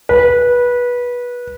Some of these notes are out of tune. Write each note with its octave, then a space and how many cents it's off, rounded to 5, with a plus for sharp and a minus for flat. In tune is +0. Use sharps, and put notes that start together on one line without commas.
B4 -20